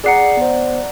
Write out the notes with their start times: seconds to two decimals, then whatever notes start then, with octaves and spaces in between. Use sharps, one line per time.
0.04 G#4 D5 F#5 A#5 C7 C#7
0.37 B3 C5